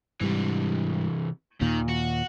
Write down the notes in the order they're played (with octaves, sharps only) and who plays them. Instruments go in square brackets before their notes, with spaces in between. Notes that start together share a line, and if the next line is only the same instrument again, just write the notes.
[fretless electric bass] G#2 G3 [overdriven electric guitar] C3 E3
[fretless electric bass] D#2 A#2 [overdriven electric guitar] D#3
[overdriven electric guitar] F#4